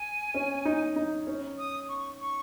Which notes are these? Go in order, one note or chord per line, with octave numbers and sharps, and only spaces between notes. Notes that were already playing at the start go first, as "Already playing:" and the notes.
Already playing: G#5
C#4
D#4
D#4
C#4
D#6
C#6
C#6